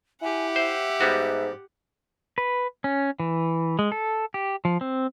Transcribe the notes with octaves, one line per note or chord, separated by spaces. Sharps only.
E4 G4 F#5 G#5
C5 E5
G#2 G3 B3 F#4
B4
C#4
E3
G#3
A4
G4
F3
C4